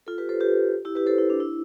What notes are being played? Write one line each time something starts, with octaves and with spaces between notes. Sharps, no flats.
F4 A4
G4 B4
A4 C5
G4 B4
E4 G4
G4 B4
A4 C5
E4
D4
E4